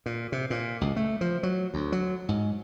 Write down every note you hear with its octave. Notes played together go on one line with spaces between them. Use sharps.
A#2
C3
A#2
C#2
A3
F3
F#3
D2
F#3
G#2